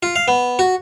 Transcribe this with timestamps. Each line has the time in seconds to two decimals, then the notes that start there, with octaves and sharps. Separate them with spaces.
0.03 F4
0.16 F5
0.28 B3
0.59 F#4